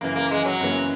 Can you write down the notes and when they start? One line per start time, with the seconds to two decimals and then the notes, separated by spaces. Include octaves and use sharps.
0.01 F#2 C#3 E3 A#3
0.16 A#3
0.31 G#3
0.45 F#3
0.60 F#2 C#3 E3 A#3